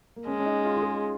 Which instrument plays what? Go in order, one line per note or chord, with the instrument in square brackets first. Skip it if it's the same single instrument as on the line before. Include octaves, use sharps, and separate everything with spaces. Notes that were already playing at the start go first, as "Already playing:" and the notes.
[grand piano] A#3
[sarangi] G#3 [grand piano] C#4
[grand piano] C#4
D#4
F4
F4
G#4